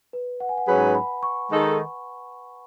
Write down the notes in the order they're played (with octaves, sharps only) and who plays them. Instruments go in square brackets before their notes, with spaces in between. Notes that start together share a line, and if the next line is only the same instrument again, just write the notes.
[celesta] B4
F#5
G#5
F#5
[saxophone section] G#2 F#3 C#4 G#4 B4 [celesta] B5
[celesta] B5
C#6
[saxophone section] D#3 G#3 D#4 A4